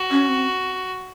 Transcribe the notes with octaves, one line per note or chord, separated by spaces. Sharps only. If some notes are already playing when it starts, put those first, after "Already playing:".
Already playing: F#4
C#4
C4